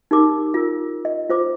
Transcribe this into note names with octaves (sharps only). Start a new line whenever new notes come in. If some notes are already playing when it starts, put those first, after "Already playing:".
D#4 G4 A#4 D6
F4 A#4
D#5
F4 C5 D6